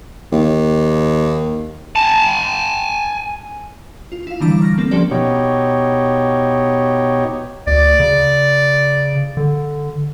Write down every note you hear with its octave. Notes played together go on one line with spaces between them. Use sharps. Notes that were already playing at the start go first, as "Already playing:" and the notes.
D#2
G#5 A5
F4
E4 F5
D3 E3 G3 D4 A#5 D6
C#6 F6 A#6
A#3 C4 A4
D3 F3 C#4 G4 B4 D5
B2 D#4 G4 C#5
D2 D5
C#3
D3